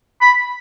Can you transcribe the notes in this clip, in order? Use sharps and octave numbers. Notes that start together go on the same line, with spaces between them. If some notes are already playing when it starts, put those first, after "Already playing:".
B5